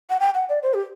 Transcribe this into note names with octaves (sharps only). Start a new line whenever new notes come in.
F#5
G5
F#5
D5
C5
G4